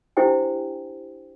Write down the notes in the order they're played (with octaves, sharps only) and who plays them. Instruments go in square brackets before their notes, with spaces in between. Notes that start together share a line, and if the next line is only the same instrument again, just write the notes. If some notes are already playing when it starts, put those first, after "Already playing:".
[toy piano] D4 E4 G4 C5 G5 G#5